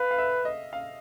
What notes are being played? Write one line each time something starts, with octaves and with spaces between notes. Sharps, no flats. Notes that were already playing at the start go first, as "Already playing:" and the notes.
Already playing: B4 F5
F5
E5
D#5
F5